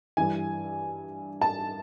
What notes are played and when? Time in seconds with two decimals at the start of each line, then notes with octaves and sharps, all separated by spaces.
0.17 G2 E3 G#5
1.41 A5